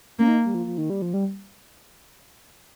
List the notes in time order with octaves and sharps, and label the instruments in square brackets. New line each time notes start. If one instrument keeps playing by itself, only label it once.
[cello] A#3 [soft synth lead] C#4
[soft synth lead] D#4
G3
F3
F3
D#3
G3
F3
G3